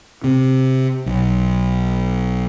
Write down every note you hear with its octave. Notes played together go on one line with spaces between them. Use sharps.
C3
B1